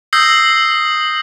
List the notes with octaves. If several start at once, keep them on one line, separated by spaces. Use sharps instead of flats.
D#6 E6 G6 A#6 C7 F#7